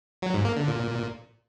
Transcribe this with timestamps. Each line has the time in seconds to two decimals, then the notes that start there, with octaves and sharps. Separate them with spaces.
0.22 F#3
0.34 G#2
0.45 A#3
0.56 D3
0.68 A#2